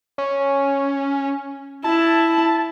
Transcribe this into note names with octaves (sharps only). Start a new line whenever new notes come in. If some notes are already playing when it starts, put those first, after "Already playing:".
C#4
E4 A5